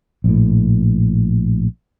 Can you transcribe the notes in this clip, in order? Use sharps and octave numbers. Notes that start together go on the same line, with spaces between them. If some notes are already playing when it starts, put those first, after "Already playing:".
A#1 A2